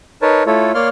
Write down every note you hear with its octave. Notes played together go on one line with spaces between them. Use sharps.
D#4 A#4 B4 C#5 A5
A3 E4 F4 A4 C#5
A#3 C#5 D5 F5 C6 F6